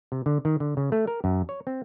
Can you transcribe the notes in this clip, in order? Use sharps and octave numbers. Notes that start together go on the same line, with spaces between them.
C3
D3
D#3
D3
C#3
A3
A#4
F#2
C#5
C4